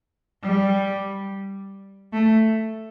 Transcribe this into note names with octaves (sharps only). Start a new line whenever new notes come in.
G3
A3